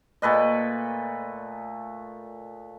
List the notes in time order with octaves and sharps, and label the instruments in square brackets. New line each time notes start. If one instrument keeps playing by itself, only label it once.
[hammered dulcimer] A#2 A3 B4 D#5